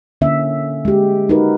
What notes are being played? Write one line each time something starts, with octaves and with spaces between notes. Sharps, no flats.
D3 A#3 C#4 E5
G#3 G4
D#4 F#4 A#4 B4